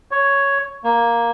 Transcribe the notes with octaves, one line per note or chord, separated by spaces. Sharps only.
C#5
A#3